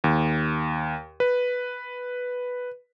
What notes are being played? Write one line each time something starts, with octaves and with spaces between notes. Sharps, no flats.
D#2
B4